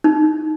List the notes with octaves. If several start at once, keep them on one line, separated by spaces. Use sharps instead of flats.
D#4